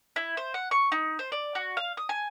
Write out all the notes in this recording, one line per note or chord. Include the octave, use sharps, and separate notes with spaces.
E4
C5
F#5
C#6
D#4
C5
D5
F#4
F5
D#6
G#5